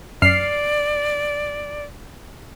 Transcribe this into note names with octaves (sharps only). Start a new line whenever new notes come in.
F#2 D5 F6 C7